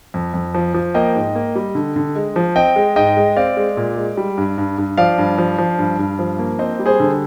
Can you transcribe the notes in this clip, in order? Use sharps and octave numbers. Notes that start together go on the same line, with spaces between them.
F2
F2
F3
F3
A#3 D#5 G5
G#2
A#3
G3
D3
D3
G#3
F3
C4 D#5 G5
G#3
G#2 D#5 G5
G#3
C4 D5 F5
G#3
A#2
G#3
G3
G2
G2
G2
F3 D5 F5
G2
F3
F3
G2
G2
F3
A#3
C4 C5 D#5
G3
G#4 C5
D3